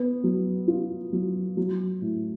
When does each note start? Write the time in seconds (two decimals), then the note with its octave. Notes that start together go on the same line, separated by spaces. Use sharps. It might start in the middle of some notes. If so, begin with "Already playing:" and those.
Already playing: B3
0.24 F#3
0.68 F4
1.12 F#3
1.57 F#3
2.02 A2